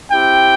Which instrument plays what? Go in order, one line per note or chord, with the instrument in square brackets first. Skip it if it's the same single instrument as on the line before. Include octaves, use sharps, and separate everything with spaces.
[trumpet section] C4 E4 G4 G5